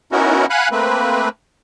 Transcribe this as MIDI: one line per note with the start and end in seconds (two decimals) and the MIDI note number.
0.12 0.46 59
0.12 0.46 61
0.12 0.46 63
0.12 0.46 64
0.12 0.46 66
0.12 0.46 70
0.50 0.68 77
0.50 0.68 78
0.50 0.68 80
0.50 0.68 83
0.50 0.68 90
0.71 1.29 57
0.71 1.29 58
0.71 1.29 60
0.71 1.29 71